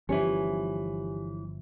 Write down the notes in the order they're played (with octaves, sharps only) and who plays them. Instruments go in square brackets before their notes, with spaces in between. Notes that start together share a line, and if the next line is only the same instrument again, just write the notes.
[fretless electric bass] G1 F3 C#4 [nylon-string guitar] E3 C#5 [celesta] G4 G#5